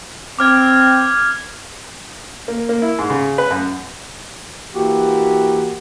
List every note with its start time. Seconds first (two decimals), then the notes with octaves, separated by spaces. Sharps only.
0.39 C4 D6 F6 G#6
2.48 A#3
2.69 A#3
2.82 E4
2.99 G#2
3.10 C#3
3.38 B4
3.51 F#2
4.74 E3 A#3 F#4 G4